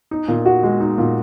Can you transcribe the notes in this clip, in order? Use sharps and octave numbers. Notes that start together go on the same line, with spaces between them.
D#4
A#2
F#4
G#3
D#4
A#2